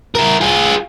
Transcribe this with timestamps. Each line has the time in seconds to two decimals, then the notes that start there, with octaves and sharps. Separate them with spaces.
0.15 E4 A#4
0.41 F4 G#4